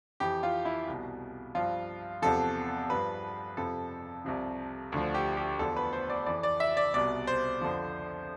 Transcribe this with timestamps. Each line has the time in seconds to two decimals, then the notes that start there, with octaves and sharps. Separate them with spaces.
0.20 F2 E3 G4
0.43 F4
0.65 E4
0.88 C2 B2
1.55 G2 F3 F4
2.22 E2 C3 F3 A4
2.90 G2 F3 B4
3.57 F2 C3 F3 A4
4.25 C2 C3 F3
4.92 D2 D3 F3
5.14 G4
5.37 G4
5.59 E2 D3 F3 A4
5.76 B4
5.93 C5
6.10 D5
6.26 F2 E3 D5
6.43 D5
6.60 E5
6.77 D5
6.94 C2 B2 D5
7.27 C5
7.61 F2 D3 F3